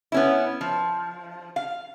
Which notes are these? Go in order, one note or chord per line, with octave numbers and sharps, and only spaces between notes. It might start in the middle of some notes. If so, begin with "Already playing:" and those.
B3 C#4 E4
F3
F5